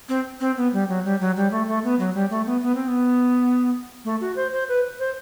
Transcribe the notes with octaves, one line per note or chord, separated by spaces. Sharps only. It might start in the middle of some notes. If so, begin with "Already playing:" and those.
C4
C4
B3
G3
F#3
G3
F#3
G3
A3
A3
B3
F#3
G3
A3
B3
B3
C4
B3
A3
F#4
C5
C5
B4
C5